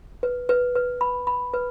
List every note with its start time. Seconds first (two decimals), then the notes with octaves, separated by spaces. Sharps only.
0.23 B4
0.49 B4
0.75 B4
1.01 B5
1.27 B5
1.54 B4